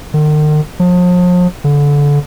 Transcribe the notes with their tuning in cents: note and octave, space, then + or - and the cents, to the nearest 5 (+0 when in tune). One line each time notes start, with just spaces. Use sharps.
D#3 -45
F3 +40
D3 -25